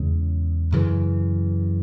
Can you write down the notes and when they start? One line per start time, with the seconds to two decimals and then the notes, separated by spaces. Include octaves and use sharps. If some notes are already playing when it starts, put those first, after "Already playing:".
Already playing: E2 C#3 G#3 C#4
0.72 F#2 C#3 E3